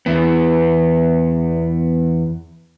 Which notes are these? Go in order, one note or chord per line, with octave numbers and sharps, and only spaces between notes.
E2 B3